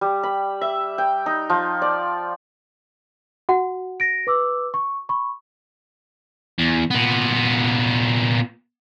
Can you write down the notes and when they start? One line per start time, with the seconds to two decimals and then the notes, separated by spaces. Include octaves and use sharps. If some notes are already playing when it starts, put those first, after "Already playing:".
0.01 G3
0.23 B5
0.61 E5
0.98 G5
1.26 D#4
1.50 F3
1.82 D5
3.49 F#4 F#5
4.00 A#6 D7
4.27 B4 D6 E6
4.74 C#6
5.09 B5 C#6
6.58 E2
6.91 A#2 B3